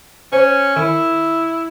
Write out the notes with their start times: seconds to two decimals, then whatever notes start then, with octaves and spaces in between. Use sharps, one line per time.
0.33 C#4 C5
0.76 D#3 E4